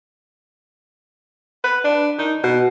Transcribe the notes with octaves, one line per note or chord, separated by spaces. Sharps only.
B4
D4
D#4
B2